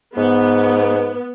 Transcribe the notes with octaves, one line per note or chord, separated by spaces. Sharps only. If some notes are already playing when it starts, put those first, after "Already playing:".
G#2 B3